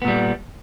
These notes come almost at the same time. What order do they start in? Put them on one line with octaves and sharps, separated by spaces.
B3 A#2 G3